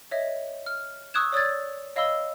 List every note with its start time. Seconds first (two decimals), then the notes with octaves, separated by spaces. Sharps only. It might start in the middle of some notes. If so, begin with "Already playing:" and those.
0.11 C#5 D#5 E5
0.66 F6
1.14 C#6 D#6 E6 F#6 G#6 E7
1.32 C#5 D5 D#6 E6 G#6 A6
1.96 C#5 D#5 F5 B5 E6 G7